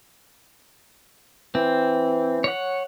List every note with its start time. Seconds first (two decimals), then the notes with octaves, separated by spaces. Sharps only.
1.55 E3 C4
2.44 C#5 F#5